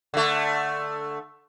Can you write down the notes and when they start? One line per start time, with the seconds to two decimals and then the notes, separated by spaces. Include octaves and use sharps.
0.14 D3 A3